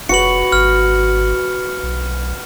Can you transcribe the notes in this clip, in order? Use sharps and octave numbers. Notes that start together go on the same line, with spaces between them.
F1 F#4 B4 C#7 F#7
G#1 F6
B1